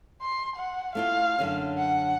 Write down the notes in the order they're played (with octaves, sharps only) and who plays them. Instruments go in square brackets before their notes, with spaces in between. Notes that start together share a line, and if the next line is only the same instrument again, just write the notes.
[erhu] C6
F#5
[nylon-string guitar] A3 E4 F4 [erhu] F5
[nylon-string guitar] F#2 D3 C#4
[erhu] F#5